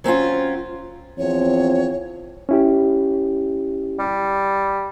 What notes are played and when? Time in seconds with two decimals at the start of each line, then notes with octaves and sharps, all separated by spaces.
0.04 F#3 C4 C#4 F4
1.18 E2 F3 C4 C#5
2.49 C#4 E4 G4
3.99 G3